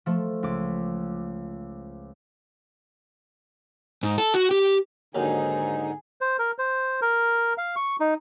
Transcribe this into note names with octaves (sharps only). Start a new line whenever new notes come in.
F3 A3
C#2 D6
G#2
A4
F#4
G4
D#2 G#2 D3 D#3 F#3 D#4 G#4
C5
A#4
C5
A#4
F5
C#6
D#4